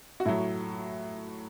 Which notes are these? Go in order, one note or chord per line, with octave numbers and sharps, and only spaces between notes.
F#4
A2 F#3 E4